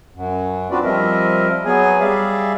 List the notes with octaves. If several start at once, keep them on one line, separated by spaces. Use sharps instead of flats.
F#2
C4 D4 F4 F#4 B4 D5
F3 G3 C4 A#4 D#5 E5
F#3 B3 G#4 G#5
G3 G#4 D5 E5 F5